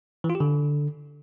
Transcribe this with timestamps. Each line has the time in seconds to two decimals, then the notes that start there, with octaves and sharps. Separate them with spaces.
0.24 E3
0.30 F4
0.35 G4
0.40 D3